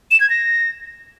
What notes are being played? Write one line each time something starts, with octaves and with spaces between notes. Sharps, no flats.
E7
G#6
A#6